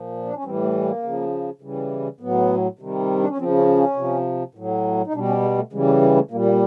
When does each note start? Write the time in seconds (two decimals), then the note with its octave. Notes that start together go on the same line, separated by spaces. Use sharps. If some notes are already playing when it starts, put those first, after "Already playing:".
Already playing: A#2 F3
0.26 D4
0.35 C#4
0.44 A2 E3 G3 C4
0.64 A3
0.83 A#3
1.03 C#3 F3
1.61 C#3 E3 G3
2.20 A2 F#3 B3
2.79 C3 D#3 G3
3.19 D4
3.28 C#4
3.38 F3 C4
3.41 C#3
3.58 C#4
3.76 C#4
3.96 C3 F3
4.55 A2 F#3
5.07 D#4
5.14 B2 G3 D4
5.28 C#4
5.42 G#3
5.58 A3
5.73 C#3 E3 G3 G#3
5.87 A3
6.02 A#3
6.16 A3
6.31 A#2 G3 A#3
6.45 A#3